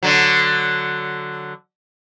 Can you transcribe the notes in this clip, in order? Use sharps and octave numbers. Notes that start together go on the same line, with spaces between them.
D3 F#3